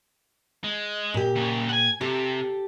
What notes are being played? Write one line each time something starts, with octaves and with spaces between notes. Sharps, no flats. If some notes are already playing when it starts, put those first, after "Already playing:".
G#3
A#2 G4
C#3 A#3
F#5 G#5
C3 G4 A4